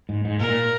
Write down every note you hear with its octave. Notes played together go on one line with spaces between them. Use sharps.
G#2
G#2
A#2 A#4